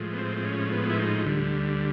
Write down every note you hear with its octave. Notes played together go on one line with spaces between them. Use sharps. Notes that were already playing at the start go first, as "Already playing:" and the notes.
Already playing: A2 F3 G#3
B3
C4
C4
C#4
B3
E4
D#4
D2 D3 G3